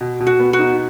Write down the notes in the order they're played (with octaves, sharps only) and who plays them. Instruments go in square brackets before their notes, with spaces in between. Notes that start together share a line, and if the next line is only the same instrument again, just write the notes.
[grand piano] B2
B2
[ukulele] F#4
[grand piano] B3
[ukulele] F#4
[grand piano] D#4